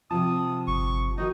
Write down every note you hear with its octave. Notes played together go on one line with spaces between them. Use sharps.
C3 F3 F4 A5 D#6
G1 C#6
D#3 D#4 F#4 D#5